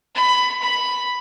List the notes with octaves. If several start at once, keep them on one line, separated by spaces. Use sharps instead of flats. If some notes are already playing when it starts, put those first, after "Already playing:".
B5
B5